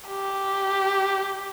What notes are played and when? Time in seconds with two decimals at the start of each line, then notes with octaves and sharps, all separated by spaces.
0.09 G4